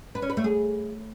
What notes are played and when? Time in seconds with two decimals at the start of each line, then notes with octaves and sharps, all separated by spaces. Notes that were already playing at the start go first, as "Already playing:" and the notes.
0.15 B4
0.22 C#4
0.30 B4
0.37 A3
0.44 G#4